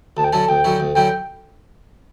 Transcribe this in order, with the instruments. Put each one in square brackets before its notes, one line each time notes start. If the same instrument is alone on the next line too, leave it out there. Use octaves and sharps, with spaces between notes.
[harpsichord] D2 [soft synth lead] A5
[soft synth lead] G5
[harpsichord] D3 F#3 C#4 E4 [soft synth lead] A5
[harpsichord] D2 [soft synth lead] G5
[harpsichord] D3 F#3 C#4 E4
D2
[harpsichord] D3 F#3 C#4 E4 [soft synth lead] G5